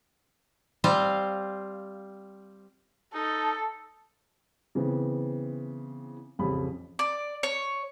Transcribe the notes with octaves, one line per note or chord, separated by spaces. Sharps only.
G3 C4 F4 C5 F5
D#4 A4
C#3 E3 B3 C4
A1 F2 C#3 B5
D5
C#5